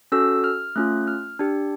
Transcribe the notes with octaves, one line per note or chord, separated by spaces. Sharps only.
C#4 F#4 A4 E6
F6
A3 C#4 F4 F#6
F6
D4 G4